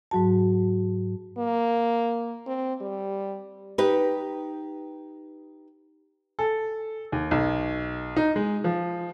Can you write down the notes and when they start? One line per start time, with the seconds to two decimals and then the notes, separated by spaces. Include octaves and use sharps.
0.11 G#2 F#3 F#4 A5
1.38 A#3
2.47 C4
2.81 G3
3.78 D#4 G4 B4
6.39 A4
7.12 D#2
7.31 B1
8.17 D#4
8.36 G#3
8.64 F3